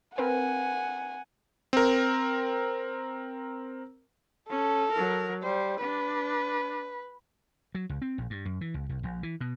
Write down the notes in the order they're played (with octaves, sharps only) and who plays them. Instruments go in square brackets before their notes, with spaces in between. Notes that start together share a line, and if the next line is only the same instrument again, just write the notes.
[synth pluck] C4 A#4 B4 [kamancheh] F#5 G#5
[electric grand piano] C4 A#4
[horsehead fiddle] C#4 [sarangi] A4
[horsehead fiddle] F#3 A#4
[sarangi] G3 [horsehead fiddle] C5
[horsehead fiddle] D4 [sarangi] B4
[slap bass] F#3
C#2
C4
A#1
G2
F#2
E3
C#2
C2
A#1
E3
B2